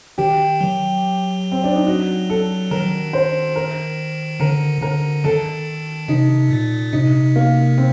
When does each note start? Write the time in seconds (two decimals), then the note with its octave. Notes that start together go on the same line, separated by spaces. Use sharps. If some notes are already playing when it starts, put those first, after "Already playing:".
0.18 D#3 G4
0.61 F#3
1.52 C4
1.64 D4
1.75 D#4
1.87 F#4
2.30 A4
2.71 D#3 A#4
3.13 C5
3.56 A#4
4.40 D3 A#4
4.82 D3 A#4
5.24 D#3 A4
6.08 C3 D#4
6.51 A#2
6.93 C3 D#4
7.36 A#3
7.78 C4